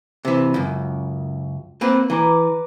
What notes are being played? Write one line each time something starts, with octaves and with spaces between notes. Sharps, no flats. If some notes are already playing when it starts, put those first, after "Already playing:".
C3 E3
C#2 F#2
A#3 C4 B4
E3 B4 A#5 D6